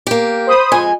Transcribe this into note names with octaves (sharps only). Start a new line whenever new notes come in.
A#3 G4
C5 B5 D#6
F2 G#3 G#5